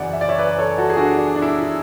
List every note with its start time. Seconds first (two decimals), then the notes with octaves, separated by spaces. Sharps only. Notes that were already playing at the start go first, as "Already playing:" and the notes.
Already playing: F#2 C#3 E3 D5 F#5
0.13 E5
0.21 D5
0.29 C#5 E5
0.39 B4 D5
0.58 A4 C#5
0.78 F#4 A4
0.90 G#4
0.97 D4 F#4
1.17 D4
1.36 D4
1.42 E4
1.60 E4